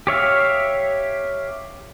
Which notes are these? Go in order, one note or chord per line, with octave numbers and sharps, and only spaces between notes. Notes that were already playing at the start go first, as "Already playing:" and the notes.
G4 C#5 E5 F5